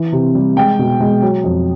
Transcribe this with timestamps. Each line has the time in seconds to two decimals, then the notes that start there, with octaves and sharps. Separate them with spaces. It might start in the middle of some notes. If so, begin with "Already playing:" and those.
Already playing: E3
0.12 C3
0.35 G3
0.56 G#3 G5
0.79 B2
1.00 G#3
1.22 F#3
1.44 F2